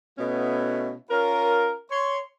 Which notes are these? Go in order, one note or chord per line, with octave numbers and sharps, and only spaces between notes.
B2 A3 B3 C#4 E4
C#4 F4 A#4
C#5 C6